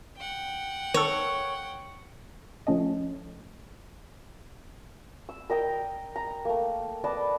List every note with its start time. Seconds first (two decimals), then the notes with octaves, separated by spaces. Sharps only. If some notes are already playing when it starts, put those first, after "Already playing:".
0.17 F#5 G5
0.94 D#3 A4 C#5
2.67 F3 A3 C#4 A4 D#5
5.29 E6
5.50 A#4 D#5 G5
6.16 A#5
6.45 A3 A#3
7.04 B4 D5 D#5 A5